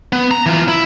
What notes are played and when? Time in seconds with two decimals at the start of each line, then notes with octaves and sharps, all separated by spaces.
0.13 B3
0.31 A#5
0.46 E3 F4
0.68 E4